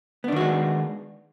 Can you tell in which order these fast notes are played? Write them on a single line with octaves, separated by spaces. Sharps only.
B3 D4 D#3 F#4 G#3